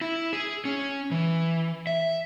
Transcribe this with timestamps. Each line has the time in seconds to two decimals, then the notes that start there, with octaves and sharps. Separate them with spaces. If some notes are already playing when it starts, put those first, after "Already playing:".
0.01 E4
0.33 G#4
0.65 C#4
1.11 E3
1.87 E5